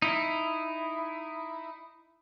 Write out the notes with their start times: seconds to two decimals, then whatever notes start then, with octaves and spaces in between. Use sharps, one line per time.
0.02 D#4 E4